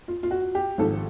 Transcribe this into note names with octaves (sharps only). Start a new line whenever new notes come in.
F4
F4
F#4
G4
G#1 G#2 F3 A4